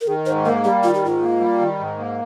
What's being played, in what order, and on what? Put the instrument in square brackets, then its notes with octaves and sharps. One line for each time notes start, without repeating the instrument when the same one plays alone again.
[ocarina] A#4
[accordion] D#3 [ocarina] G#4
[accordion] G#2 [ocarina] C5
[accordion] A#3 [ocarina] A#4
[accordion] G3 [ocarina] G4
[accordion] D#3 [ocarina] F4
[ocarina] G4
[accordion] G#2 [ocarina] F4
[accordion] A#3
G3
D#3
G#2
A#3